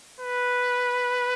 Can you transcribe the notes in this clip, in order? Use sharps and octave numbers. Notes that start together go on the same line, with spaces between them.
B4